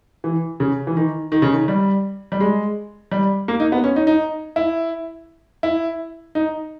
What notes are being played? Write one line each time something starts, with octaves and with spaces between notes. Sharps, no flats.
E3
C#3
E3
D#3
D#3
C#3
D#3
G3
G3
G#3
G3
A#3
D#4
B3
C#4
D#4
D#4
E4
E4
D#4